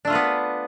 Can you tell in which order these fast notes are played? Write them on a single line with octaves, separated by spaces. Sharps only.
D4 A3 F4 B4 B3